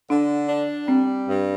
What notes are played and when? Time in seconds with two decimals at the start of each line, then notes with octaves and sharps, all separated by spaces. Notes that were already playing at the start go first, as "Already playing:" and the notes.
0.10 D3 D4
0.49 D4
0.88 G3 C4
1.27 G2